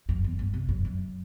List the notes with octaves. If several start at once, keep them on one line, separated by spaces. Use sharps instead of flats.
F#2
E2
G2
C3
F#2
F#2